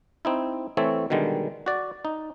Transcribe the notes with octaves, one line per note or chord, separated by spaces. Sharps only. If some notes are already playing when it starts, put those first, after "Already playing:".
C4 D#4 E4
E3 A3 C4 A4 C#5
B2 D3 D#3 G3 G#3
F#4 D5
D#4